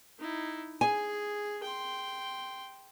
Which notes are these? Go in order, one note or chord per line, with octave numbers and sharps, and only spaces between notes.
D#4 E4
G#4 G#5
G5 C6